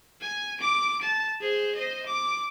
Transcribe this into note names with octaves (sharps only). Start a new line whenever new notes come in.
G#5
D6 D7
A5
G#4 C5
C5 D#5
D6